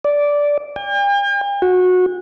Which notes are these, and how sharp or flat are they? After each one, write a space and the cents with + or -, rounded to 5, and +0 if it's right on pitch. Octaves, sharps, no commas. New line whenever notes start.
D5 -10
G5 +45
F#4 -20